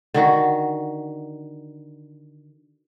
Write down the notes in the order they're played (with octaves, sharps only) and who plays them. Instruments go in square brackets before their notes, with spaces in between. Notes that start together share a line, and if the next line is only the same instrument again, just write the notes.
[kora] D3 D#3 F#4